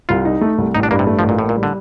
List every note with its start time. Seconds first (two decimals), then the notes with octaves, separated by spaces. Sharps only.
0.09 C2 F4
0.25 D#4
0.41 A3
0.58 C2
0.75 A1 D#4
0.83 D4
0.91 G2 A#3
0.99 C3
1.07 A3
1.19 F3
1.24 A1 A#2
1.39 A2 A#3
1.49 A#2
1.56 G3
1.63 D3